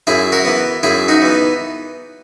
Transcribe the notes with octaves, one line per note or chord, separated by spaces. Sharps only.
F#2 E4 G#4
F#4 A#4
E3 B3
F#2 E4 G#4
D#4 F#4
E3 B3